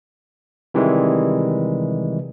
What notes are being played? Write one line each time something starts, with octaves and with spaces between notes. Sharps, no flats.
C3 D#3 E3 G3 G#3